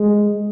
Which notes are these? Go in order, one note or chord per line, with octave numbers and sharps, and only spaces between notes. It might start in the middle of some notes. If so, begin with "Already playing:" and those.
Already playing: G#3